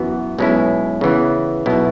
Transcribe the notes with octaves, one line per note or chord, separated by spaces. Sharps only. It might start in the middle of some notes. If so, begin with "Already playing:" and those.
Already playing: F#2 E3 B3 F#4
B1 B2 G#3 C#4 E4
C#3 E3 B3
B1 B2 B3 E4